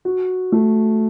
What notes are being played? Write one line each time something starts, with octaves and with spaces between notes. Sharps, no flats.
F#4
A3